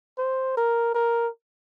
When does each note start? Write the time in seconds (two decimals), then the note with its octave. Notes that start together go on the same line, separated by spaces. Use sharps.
0.18 C5
0.57 A#4
0.94 A#4